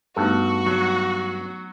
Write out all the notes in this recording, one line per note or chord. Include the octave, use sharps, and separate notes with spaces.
G2 A3 B3 D#4 F#4 A4
F#3